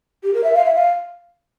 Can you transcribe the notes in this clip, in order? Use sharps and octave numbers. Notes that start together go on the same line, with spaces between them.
G4
A#4
E5
F5
E5
F5